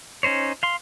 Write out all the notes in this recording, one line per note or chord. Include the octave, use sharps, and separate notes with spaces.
C#4 D#4 C5 C#5
F5 C6